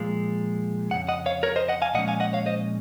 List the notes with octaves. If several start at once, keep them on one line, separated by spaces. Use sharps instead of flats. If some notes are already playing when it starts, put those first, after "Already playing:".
Already playing: A#2 F3 G#3
F2 C#3 F#5
D#5 F#5
C#5 F5
A#4 C#5
C5 D#5
D#5 F#5
F5 G#5
A#2 F3 G#3 C#4 D#5 F#5
F5 G#5
D#5 F#5
C#5 F5
C5 D#5